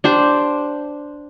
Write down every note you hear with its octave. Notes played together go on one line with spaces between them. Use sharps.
D4 G4 C5